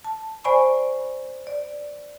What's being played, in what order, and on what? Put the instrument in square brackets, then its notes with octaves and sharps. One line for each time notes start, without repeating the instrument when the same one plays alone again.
[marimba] A5
C5 D5 G#5 B5 C#6
D5